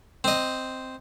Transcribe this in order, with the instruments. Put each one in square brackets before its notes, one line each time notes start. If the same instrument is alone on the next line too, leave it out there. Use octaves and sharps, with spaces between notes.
[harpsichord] C4 D#5